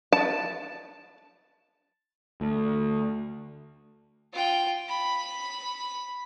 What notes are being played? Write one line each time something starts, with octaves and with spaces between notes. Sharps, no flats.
A5
D2
F4 G5
B5